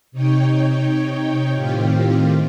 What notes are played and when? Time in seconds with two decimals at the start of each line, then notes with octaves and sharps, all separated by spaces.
0.12 C3 D#4 C#5 G5
1.53 A2 D#3 C4 F4 G4